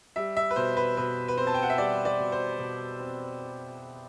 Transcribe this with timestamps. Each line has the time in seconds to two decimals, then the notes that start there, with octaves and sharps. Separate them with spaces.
0.16 G3 E5
0.37 E5
0.51 B4
0.56 B2 C5
0.77 B4
0.97 B2 B4
1.28 B4
1.38 C4 C5
1.47 A5
1.55 G5
1.63 F#5
1.70 E5
1.78 G3 D5
2.05 D5
2.19 B2
2.32 C5
2.59 B2
3.00 C4